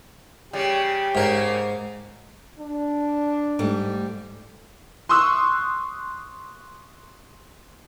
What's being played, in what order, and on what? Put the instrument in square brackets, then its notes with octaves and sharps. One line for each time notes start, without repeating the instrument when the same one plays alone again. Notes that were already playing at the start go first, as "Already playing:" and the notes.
[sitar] C#3 G3 [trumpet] G4
[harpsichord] G#2 A#4 [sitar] C#3 A#3
[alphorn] D4
[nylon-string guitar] G#2 G3 A3
[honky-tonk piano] C6 C#6 D#6 E6 F#6